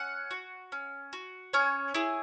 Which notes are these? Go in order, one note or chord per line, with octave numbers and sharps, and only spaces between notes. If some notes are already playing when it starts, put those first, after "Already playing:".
Already playing: C#4 F#5
F#4
C#4
F#4
C#4 C#5
E4 G#4